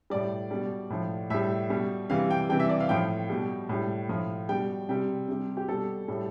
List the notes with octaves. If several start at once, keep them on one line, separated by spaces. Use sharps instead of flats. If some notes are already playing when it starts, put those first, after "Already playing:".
A2 G3 D5
B2 G3
A2 F3
A2 G3 E5
B2 G3
C3 E3 G3 F5
G5
C3 E3 G3 G5
E5
D5
F5
A2 F3 G5
B2 G3
A2 G3
A2 F3
B2 G3 G5
C3 G3 G5
C3 G3
G4
B2 G3 A4
A2 G3